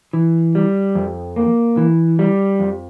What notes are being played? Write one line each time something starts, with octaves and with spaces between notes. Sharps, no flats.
E3
G3
F2
A#3
E3
G3
F2